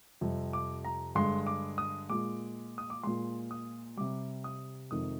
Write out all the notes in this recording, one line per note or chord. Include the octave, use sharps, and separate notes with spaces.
F2 C3 G3
D6
A#5
G2 D3 G#3 C6
D6
D#6
A#2 G#3 D6
D#6
D6
A#2 G#3 C6
D#6
C3 G3 D6
D#6
F2 C3 D#3 G#3 D#6